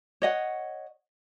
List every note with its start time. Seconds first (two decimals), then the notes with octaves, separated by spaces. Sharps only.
0.22 C#5 D#5 F#5